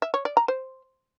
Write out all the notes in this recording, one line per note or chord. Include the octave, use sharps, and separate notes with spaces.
E5
C#5
D5
A#5
C5